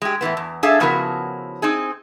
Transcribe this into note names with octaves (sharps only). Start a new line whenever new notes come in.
G#3 G4
A2 C3 E3 B3
E2
D4 G#4 A4 E5 F5
C#3 F3 B3 E4 F#4 A#4
C4 D#4 G#4